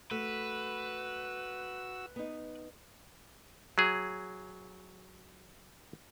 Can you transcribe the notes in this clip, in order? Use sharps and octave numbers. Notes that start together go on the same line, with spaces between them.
A3 F#4 B4 E6
B3 D#4
F#3 G#4